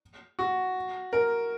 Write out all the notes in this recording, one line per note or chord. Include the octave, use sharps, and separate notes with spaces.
F#4
A#4